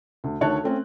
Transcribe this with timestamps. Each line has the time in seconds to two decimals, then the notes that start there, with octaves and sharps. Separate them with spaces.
0.24 D2
0.41 D2 D#3 C#5 A5 F#6
0.64 A3 C4 C#4